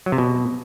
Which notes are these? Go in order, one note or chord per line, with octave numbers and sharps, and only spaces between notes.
F#3
C3
B2